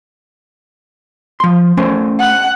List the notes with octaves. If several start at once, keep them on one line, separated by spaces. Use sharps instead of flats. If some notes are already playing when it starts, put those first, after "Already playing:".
F3 C6
A3 C#4 C5
F#5